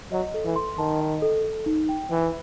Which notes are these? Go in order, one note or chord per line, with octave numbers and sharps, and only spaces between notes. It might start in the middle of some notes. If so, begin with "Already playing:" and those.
F#3 D#5
A4
E3
C6
D#3 A5
D#5
A4
A4
D#4
G5
E3 E5